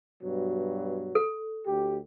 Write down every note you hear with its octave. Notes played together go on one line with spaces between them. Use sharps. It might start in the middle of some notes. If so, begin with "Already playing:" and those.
G2 B2 F#3
A4
D2 G4